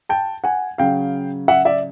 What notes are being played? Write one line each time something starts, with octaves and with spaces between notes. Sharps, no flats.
G5 A5
F#5 G#5
C#3 F#3 F5 G5
E5 F#5
D5 E5